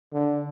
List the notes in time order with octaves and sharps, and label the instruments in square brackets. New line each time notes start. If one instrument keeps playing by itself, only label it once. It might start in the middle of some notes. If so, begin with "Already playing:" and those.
[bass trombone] D3